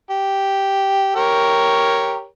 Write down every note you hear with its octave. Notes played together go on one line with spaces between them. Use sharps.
G4
G4 A#4 C#5